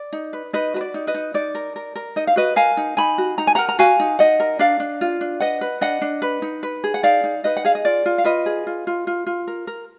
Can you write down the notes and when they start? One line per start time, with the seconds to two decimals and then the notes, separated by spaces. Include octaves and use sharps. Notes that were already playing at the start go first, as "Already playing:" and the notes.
Already playing: D5
0.13 D#4
0.33 B4
0.53 D#4 B4 D#5
0.74 F#4 B4
0.81 D5
0.94 D#4
1.07 B4 D#5
1.14 D#4
1.34 D#4 D5
1.55 A#4
1.76 A#4
1.96 A#4
2.16 D#4 D#5
2.27 F5
2.36 F#4 B4 D#5
2.56 A#4 F5 G#5
2.77 D#4
2.97 D#4 G#5 B5
3.18 F#4
3.38 D#4 A#5
3.47 G#5
3.55 A#4 F#5 A#5
3.69 A#5
3.79 F#4 F5 G#5
4.00 D#4
4.19 D#4 D#5 F#5
4.40 A#4
4.59 D4 D5 F5
4.80 D4
5.01 F4
5.21 D4
5.40 B4 D#5 F#5
5.61 B4
5.81 D4 D#5 F#5
6.01 D4
6.22 B4
6.42 D#4
6.63 B4
6.84 G#4
6.94 F#5
7.03 D#4 D5 F5
7.24 D#4
7.44 D#4 B4 D#5
7.56 F#5
7.65 G#4 F5
7.75 D#5
7.85 F4 D5
8.06 F4
8.18 F5
8.24 F4 B4 D#5
8.46 G#4
8.67 F4
8.87 F4
9.07 F4
9.27 F4
9.47 A#4
9.67 A#4